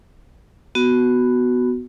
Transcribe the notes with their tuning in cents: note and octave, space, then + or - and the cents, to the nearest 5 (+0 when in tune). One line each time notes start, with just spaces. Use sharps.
B3 +5 F#4 +0